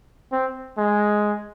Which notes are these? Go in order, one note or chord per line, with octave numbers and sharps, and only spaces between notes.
C4
G#3